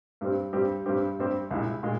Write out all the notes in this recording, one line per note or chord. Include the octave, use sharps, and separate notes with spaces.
G2 G3 C4 G4
G2 G3 C4 G4
G2 G3 C4 G4
G2 G3 C4 G4
C2 A#2 G#3 E4
A#2 G#3